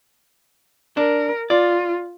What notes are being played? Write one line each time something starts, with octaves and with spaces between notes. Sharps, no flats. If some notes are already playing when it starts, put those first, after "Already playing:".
D4 A#4
F4 D5